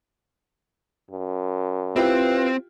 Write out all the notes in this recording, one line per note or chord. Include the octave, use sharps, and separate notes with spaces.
F#2
C4 E4 F4 G4 B4